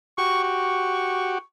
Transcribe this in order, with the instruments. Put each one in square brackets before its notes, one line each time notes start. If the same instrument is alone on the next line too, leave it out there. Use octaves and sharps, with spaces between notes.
[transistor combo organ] F#4 G4 [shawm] C#6
[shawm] C#6